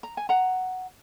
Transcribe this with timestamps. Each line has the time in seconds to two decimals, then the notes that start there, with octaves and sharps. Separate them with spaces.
0.03 A#5
0.17 G#5
0.29 F#5 A#5